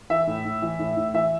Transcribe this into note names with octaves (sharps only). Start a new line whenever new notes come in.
E3 E5
A2
A2
E3
A2
A2
E3 E5